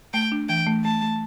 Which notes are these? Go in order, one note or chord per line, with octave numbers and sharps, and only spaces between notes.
A3 G5
D4
E3 G5
A3
A3 A5
A3